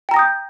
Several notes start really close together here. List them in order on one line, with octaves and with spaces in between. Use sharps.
G5 A#5 A#6 D#6 G6